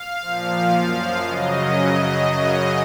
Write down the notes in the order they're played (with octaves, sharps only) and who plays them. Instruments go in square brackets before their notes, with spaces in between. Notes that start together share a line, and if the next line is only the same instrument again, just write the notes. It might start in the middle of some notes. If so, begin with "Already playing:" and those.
Already playing: [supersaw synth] F5
A#2 F3
F#2 F3 F5
F#2 C#3 F#3 D#5